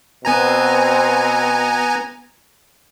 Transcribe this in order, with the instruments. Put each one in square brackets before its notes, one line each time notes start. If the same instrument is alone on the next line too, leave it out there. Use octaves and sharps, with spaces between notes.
[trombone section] B2 C4 [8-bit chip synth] B3 G#5 A#5